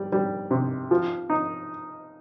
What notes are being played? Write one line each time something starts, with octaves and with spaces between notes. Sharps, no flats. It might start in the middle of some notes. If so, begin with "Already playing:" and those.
Already playing: G3
G3
C3
F3
D#4